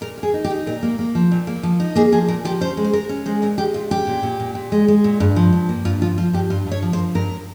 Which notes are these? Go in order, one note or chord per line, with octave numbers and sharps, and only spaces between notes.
A#2 A#4
A#3
G#4
D#4
G4
D#4
A#2 A#4
A#3
A#3
F3
A#2
A#3
F3
D#4
A#3 G#4
F3 G#4
A#2 A#4
F3 G4
C#4 C5
G#3
C5
G#3 A#4
C#4
G#3 C5
A#2 A#4
G#3 G4
A#2 F4
C#4 G4
A#2
A#2
A#2
A#2
G#3
G#3
A#2
G2
F3
G2
A#3
G2 F4
F3 F4
F3 F4
G2 G4
G2 F4
G2 C#5
F3
C5
A#3
G2 A#4